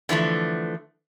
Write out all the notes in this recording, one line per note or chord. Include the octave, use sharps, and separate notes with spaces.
D3 E3 F3 A3